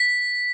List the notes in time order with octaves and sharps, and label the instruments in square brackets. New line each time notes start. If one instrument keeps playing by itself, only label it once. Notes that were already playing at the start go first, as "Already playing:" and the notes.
Already playing: [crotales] B6